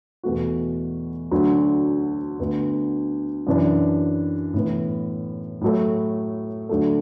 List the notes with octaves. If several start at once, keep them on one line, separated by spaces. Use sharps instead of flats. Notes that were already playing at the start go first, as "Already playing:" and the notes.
E2 B2 A3 F#4
D2 D3 F#3
D2 D3 B3
F#2 E3 D4
A2 E3 B3
A2 F#3 A3
D2 D3 F#3 A3